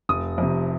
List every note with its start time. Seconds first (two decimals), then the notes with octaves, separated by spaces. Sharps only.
0.09 F1 D#6
0.38 F2 C3